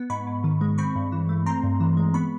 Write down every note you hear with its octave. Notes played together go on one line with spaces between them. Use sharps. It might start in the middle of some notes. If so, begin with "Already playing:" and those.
Already playing: B3
G#2 B5 C#6
G#2
D#3
G#3
C4 B5 C#6
G2
E3
A3
C4 A#5 C6
G2
E3
G#3
B3 B5 C#6